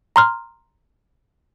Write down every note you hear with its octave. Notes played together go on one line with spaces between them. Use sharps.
A#5 C6 F6